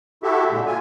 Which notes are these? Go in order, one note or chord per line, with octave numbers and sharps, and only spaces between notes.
E4 F#4 G4 A4 E5
A#2 D3 G#3
F4 G#5